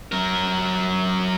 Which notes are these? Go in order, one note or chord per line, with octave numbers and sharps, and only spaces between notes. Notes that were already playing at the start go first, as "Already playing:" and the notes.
F#3 A#4